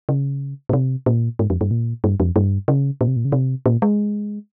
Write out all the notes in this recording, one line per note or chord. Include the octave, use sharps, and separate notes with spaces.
C#3
A#2
C3
A#2
G#2
F2
G2
A#2
G2
F2
G2
C#3
A#2
C3
A#2
C#3
C3
A#2
G#3